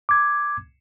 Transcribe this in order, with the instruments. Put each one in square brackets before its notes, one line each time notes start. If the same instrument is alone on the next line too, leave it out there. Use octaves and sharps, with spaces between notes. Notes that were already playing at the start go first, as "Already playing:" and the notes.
[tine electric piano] D6 G#6